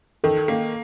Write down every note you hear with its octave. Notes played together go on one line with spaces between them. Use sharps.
D#3 A4
A#3